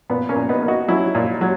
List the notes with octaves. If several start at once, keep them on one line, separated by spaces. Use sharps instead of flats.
A#2 B3
A#3 C#4
A#2
B3 D#4
A#3
D#4 F#4
F#3 C#4 E4
A#2
F#3